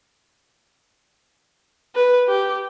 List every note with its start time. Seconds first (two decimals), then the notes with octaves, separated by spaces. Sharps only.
1.95 B4
2.28 G4